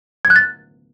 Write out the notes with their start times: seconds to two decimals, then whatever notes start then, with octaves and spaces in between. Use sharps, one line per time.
0.25 G#6
0.30 F#6
0.36 A6